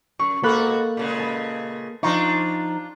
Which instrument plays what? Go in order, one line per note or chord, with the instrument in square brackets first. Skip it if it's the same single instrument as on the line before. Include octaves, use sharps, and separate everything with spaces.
[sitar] F#2 [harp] C#6
[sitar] B2 G#3 F#4 [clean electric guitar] A#3 [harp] A4 B5 F#6
[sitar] A#2 C#3 G#3
[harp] B4 A5
[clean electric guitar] F3 D#4 [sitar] D4 F4 [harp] A#5 C6 C#6